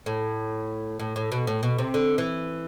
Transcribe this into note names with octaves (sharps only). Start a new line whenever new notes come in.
A2
A2
A2
B2
A2
B2
C3
D3
E3